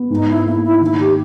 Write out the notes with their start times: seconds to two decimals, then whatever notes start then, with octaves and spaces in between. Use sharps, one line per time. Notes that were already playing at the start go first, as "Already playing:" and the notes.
Already playing: B3
0.10 G#2 D#4
0.28 E4
0.46 A#3 E4
0.63 E4
0.81 D#3 E4
0.99 G4